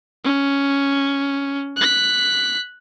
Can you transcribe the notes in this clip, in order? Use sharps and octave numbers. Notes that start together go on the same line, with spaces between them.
C#4
F#6 B6